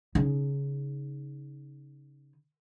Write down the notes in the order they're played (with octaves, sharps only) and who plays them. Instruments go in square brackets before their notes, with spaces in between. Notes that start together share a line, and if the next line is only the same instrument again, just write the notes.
[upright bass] C#3 D#4